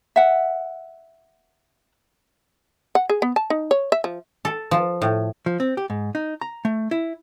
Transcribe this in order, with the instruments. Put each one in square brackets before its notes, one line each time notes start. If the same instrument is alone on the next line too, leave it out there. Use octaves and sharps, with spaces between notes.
[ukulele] E5 F#5
[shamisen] F#5
G#4
B3
A5
D#4
C#5
E5
F3
[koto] A4
F3
A2
[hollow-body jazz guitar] F3
C4
G4
G#2
D#4
A#5
A3
E4